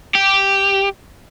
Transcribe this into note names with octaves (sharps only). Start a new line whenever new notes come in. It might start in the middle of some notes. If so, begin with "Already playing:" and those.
G4